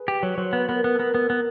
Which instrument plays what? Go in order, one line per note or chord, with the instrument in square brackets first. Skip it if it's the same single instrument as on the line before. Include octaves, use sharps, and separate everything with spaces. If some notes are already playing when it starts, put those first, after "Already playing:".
Already playing: [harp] G#4 B4
[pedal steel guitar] G4
F#3
[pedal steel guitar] F#3 [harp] C5 C#5
[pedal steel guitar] B3 [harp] B4
[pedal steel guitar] B3 [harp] A#4
[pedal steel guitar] B3
[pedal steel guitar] B3 [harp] A4 A#4
[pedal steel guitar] B3 [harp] A4
[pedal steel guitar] B3 [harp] A#4